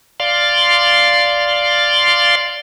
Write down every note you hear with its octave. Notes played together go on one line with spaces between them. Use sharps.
D5 F5 C6